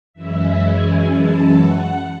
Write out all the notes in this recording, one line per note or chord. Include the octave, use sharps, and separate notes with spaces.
F#2 E3 G#3 C#4 E4 E5
G#5
A5
F#5